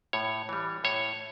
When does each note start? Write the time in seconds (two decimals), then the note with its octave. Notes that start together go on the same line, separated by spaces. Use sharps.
0.13 A2 C#5
0.49 E3 G3
0.84 A2 C#5